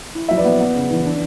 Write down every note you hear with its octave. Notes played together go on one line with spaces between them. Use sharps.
E4
F#3 E5
B4 D5
B3
B3
C#3
E3
D4